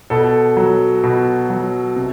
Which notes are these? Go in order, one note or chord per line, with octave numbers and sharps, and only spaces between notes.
B2 A4
F#3
B2
F#3
C3